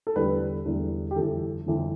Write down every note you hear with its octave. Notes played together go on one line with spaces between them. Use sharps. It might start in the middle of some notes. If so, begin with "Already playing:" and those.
A4
E2 D3 G3 B4
E2 D3 G3
G4
G1 F2 E3 A4
G1 F2 E3